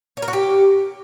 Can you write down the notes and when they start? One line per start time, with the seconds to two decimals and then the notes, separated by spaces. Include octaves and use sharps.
0.17 C#5
0.22 A#4
0.28 F#4
0.33 G4